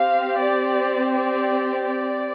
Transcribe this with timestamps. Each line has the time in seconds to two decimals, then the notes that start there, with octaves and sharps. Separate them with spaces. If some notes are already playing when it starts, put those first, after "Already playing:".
Already playing: C4 G4 F5
0.39 D5
1.12 D5
1.86 D5